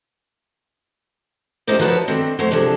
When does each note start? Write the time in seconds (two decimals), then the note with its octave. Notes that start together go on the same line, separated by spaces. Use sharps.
1.67 A3 C#4 D#4 G4 C5 D5
1.79 F3 F#4 A#4 B4 C#5 A5
2.08 D3 D#3 C4
2.39 F#3 A3 C5 C#5
2.51 C3 F3 D4 G#4 A4